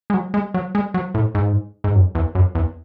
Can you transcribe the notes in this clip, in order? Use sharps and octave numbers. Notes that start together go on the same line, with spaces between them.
G#3
F#3
G#3
F#3
G#3
F#3
A2
G#2
G#2
F#2
E2
F#2
E2